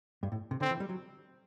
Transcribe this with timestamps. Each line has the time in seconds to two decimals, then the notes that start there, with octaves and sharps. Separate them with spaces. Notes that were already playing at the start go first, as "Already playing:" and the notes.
0.23 G2
0.32 A2
0.51 C3
0.61 D3 C4
0.71 E3
0.80 G3
0.89 F#3